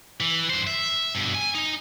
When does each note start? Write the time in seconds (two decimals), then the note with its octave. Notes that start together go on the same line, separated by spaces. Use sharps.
0.21 E3
0.50 G2 C5
0.67 E5
1.15 G2 B2
1.35 G#5
1.55 D#4